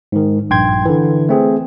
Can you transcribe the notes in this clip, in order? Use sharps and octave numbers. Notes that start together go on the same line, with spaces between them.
G#2 D#3
A#1 G2 G5 C6 G#6
D3 E3
A3 C4 G#4